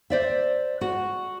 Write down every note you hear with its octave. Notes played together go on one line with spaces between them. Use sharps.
C5 D5 E5
F#4